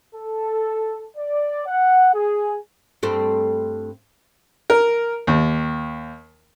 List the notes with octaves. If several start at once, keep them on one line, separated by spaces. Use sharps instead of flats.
A4
D5
F#5
G#4
G2 A3 C4
A#4
D#2